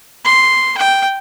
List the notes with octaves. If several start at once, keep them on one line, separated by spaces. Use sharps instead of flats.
C6
G5